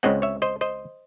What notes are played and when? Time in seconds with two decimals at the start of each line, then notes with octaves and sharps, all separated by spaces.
0.03 C#2 C#3 G#3 C4 D#5 F#5
0.22 C#5 E5
0.42 C5 D#5
0.61 C5 D#5